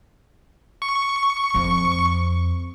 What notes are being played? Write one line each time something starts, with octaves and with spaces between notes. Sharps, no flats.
C#6
F2 C4